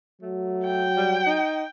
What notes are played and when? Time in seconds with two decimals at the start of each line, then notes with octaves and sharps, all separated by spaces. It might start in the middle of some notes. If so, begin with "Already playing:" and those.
0.22 F#3 A3
0.65 G5
0.97 G3
1.26 D#4